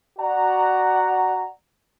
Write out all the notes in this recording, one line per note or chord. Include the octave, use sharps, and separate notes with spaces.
F#4 D5 F#5 A#5